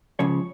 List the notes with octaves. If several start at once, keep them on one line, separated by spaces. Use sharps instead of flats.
C#2 C#3 F3 C#5